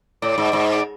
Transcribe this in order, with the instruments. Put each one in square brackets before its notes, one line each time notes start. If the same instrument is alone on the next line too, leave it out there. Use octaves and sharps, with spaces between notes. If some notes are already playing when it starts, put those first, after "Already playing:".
[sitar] A2 [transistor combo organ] D5
[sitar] G#2
G#2
[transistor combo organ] D5